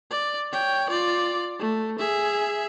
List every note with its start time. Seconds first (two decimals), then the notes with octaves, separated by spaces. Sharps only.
0.11 D5
0.52 C#5 G5
0.90 F4 D5
1.59 A3
1.99 G#4 E5